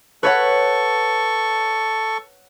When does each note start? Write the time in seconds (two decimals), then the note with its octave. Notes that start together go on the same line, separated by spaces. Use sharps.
0.23 A4 B4 C#5 F#5 C#6